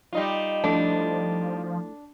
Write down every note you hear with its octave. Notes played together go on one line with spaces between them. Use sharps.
G3 D#4 F4
F3 A3 D4 E4